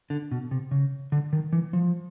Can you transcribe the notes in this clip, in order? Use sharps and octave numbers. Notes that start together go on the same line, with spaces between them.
D3
B2
C3
C#3
D3
D#3
E3
F3